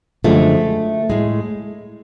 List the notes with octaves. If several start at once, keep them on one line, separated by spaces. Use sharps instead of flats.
F#2 D3 F3 G#3 A3
A2 G#3